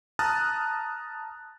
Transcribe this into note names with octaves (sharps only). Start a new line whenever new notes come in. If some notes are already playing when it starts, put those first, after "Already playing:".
A5 A#5 D#6 F6 F#6 A6